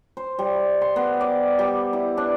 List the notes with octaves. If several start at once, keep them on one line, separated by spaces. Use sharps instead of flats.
C5
G3
C6
B3
D5
G3
E4
D4